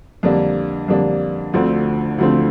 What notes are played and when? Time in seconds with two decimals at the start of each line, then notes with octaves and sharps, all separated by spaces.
0.23 F2 D3 G3 A#3 D4
0.88 F2 D3 G3 A#3 D4
1.53 D2 D3 F3 A3 C4
2.18 D2 D3 F3 A3 C4